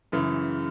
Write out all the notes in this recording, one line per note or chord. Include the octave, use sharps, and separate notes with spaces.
F#2 C#3 E3